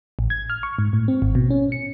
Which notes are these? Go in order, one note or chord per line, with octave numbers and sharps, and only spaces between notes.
A1
G#6
F6
C#6
G#2
A2
C4
G#1
B2
C#4
C#7